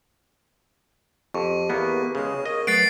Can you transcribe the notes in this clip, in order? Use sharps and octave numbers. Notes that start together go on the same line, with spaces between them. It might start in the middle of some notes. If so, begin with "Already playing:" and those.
F2 G4 C#6
E2 A#3 B3
C#3 G#3 G#4 C#5
A#4 D#5
F#3 A3 B4 F#5 A6 C7 D7